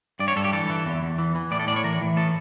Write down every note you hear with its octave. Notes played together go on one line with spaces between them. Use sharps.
G2 D5
C#5
G2 A4
G4
E3 A4
E3
E2
E2
E3
E3
A2 D5
A4
A2 D5
C#5
E3 A#4
E3
A2 A4